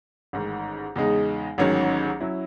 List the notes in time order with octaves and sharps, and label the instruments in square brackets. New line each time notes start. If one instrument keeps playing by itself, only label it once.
[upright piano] A1 G#2 D#3
E2 C#3 G#3 D#4
A1 G#2 D#3 F#3 C#4
F#3 C#4 E4